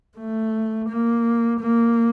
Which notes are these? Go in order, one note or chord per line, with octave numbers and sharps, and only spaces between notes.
A3
A#3
A#3